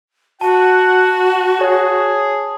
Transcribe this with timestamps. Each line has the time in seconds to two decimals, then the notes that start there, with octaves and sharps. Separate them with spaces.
0.41 F#4 F#5 A5
1.61 G#4 C#5